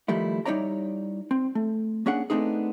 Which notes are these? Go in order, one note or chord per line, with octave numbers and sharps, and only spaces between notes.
D#3 F3 G3 A3 E4
G3 D#4 E4 C#5 D5 A#5
C4
A3
A#3 C#4 D4 G#4 F#5
A3 B3 C4 D4 D#4 G#4